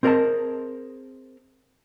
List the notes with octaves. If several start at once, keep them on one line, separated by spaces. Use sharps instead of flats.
C4 G#4 A#4 D5 D#5 A5